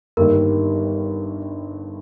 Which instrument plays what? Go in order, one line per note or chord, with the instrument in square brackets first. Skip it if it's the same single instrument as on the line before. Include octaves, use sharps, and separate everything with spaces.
[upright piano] G1 G2 D#3 G3 A#3 [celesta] A#4